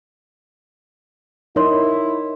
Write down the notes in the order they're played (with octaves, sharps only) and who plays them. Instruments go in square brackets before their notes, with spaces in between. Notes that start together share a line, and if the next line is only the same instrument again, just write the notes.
[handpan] D#4 [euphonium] E4 [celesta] A#4 C#5 C6